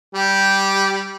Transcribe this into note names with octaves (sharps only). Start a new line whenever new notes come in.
G3 G4